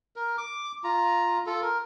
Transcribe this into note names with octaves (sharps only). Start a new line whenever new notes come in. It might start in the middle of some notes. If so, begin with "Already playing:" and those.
A#4
D6
F4 A#5
F4 A4
A#4